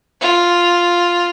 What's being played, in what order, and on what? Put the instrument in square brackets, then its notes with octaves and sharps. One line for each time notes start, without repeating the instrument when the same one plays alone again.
[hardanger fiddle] F4